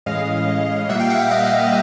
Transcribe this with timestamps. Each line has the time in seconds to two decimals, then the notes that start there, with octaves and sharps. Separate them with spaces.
0.06 A2 E3 G#3 C#4 D#5 F5
0.89 A#2 G3 A#3 E5 F#5
0.99 F5 G5
1.10 E5 F#5
1.20 E5 F#5
1.31 D#5 F5